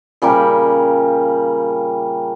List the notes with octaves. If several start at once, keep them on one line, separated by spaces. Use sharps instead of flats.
A#2 C#3 G3 A#4